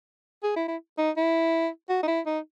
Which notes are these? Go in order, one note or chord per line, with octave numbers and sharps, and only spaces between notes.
G#4
E4
E4
D#4
E4
F#4
D#4
E4
D#4